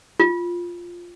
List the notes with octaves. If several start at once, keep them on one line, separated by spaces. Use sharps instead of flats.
F4